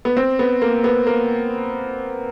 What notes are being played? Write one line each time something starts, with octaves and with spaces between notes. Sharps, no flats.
B3
C4
B3
A#3
B3
A#3